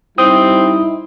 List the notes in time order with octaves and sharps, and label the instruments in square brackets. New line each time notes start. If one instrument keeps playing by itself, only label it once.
[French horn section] G3 D#4 [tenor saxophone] C4 [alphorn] E4 [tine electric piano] D#6